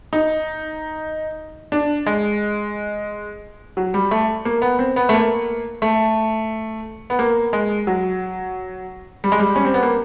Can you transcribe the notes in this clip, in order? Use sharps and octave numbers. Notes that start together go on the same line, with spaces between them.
D#4
D4
G#3
F#3
G3
A3
A#3
B3
C4
B3
A3
A#3
A3
B3
A#3
G#3
F#3
G3
G#3
G3
C#4
C4
B3
A#3